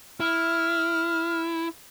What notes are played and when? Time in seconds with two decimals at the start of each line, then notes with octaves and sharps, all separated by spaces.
0.20 E4 F6